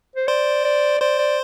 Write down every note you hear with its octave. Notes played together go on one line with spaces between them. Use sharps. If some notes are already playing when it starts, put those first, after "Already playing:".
C5
C5 D5
D5
C5 D5
D5